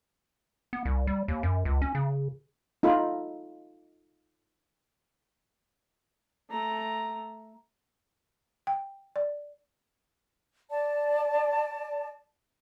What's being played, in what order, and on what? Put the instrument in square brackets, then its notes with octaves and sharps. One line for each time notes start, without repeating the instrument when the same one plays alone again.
[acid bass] B3
C2
G3
D#2
F#2
C#2
C#4
C#3
[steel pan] D#4 F4 A4 B5
[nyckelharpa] A3 A#5
[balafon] G5
D5
[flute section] D5 A5